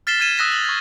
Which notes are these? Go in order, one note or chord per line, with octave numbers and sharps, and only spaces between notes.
F6 A6 B6 C7 E7 G7
F6 G#6 D#7 E7 G7
D#6 E6 F#6 A#6 B6 E7
F#7
C#6 G#6